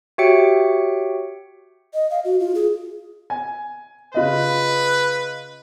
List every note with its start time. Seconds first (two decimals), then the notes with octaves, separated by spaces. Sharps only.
0.18 F#4 G4 C#5 E5 G5 C#7
1.94 D#5
2.11 F5
2.25 F#4
2.40 F4
2.55 G#4
3.30 G#5
4.14 C#3 F4 B4 D#5